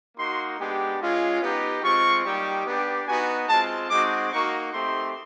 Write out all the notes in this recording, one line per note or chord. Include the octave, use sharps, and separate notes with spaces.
A#3 D#4 F#4 C6
G#3 B3 D4 G4
G#3 C#4 F4
B3 D#4 G4
G#3 C4 F4 C#6
G3 A#3 D#4 G4
B3 D4 G4
B3 D#4 F#4 G#5
G#3 C4 F4 A5
G#3 C4 D#4 F#4 D6
A#3 D#4 F#4 C#6
A3 C4 D#4 G4 C6